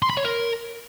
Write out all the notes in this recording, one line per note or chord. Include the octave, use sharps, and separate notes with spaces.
C6
B5
C#5
A#4